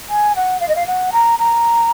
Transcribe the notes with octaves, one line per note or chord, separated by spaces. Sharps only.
G#5
F#5
F5
D#5
F5
F#5
A#5
A#5